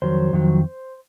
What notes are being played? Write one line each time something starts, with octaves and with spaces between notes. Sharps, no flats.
F2 D#3 F#3 C5
F2 D#3 F#3